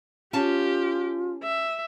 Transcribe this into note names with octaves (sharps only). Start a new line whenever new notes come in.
C#4 F4 G4 F5 A5
E5